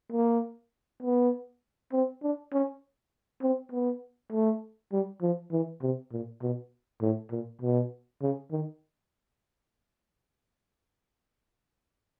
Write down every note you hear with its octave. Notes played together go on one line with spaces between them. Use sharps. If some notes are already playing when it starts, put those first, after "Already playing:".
A#3
B3
C4
D4
C#4
C4
B3
A3
G3
F3
E3
C3
A#2
B2
A2
A#2
B2
C#3
D#3